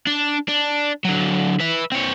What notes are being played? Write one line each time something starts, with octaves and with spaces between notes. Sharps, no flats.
D4
D4
D3 F#3
B4 E5
C4 C#5